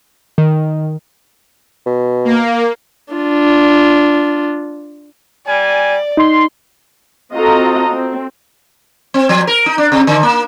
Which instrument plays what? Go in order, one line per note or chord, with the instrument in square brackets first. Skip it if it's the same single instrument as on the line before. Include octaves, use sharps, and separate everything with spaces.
[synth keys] D#3
[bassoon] B2
[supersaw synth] A#3
[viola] D4 F4
[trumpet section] G3 G#5 [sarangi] D5
[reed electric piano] D#4 [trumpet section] C6
[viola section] C4 F4 F#4 A4 D#5 A#5
C4
[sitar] C4
F3
A#4
D#4
D4
C3
D3
A#3